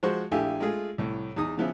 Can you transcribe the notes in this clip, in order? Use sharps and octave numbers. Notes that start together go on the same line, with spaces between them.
F3 G#3 F#4 C5 C#6
A#1 A3 E4 G4 F5 G#5
G#3 A3 F4 G#4
C2 A2
E2 D#4 D#6
C#3 E3 F3 B3 E4